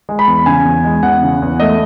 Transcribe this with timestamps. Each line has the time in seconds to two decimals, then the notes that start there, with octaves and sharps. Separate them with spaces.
0.09 G#3
0.19 B5
0.27 E2
0.46 C#3 G#5
0.65 E2
0.84 G#3
1.03 E2 F#5
1.23 C#3
1.42 E2
1.60 A3 D#5